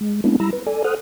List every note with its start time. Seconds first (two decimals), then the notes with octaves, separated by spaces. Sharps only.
0.01 G#3
0.24 G#3 A#3 B3 C#4 D4 E4
0.40 G3 E4 A#5 B5 E6 A#6
0.53 B4
0.67 A4 D5 G#5
0.84 A4 C5 F#5 D#6 F6 F#6